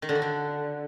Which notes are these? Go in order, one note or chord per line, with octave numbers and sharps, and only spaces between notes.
D#3
D3
F#4
D3